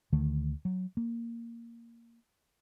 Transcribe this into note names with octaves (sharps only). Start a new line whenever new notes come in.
D2 D3 D#3 A3
F#3
A#3